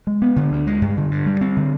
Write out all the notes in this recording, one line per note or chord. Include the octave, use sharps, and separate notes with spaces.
G#3
B3
D3
D2
G#3
G2
D3
G2
G3
C4
D3